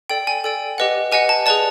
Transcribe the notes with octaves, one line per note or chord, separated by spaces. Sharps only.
A4 D5 G5
G#5
A4 D5 G5
G4 B4 D#5 F#5
G4 B4 D#5 F#5 G#5
A5
G#4 B4 D5 A5